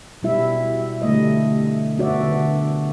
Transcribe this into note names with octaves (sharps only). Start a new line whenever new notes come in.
B2 G3 E4 E5
D3 G3 A3 D#5
B3 D4 F#4 D5 E5
D3